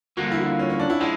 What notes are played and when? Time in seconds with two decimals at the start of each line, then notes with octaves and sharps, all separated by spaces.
0.17 G2 D3 F3 A#3 F#4
0.32 E4
0.40 F#4
0.45 F4
0.59 C#4
0.70 C#4
0.80 D4
0.90 E4
1.00 F3 G#3 E4